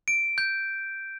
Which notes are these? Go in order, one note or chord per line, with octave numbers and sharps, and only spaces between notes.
D7
G6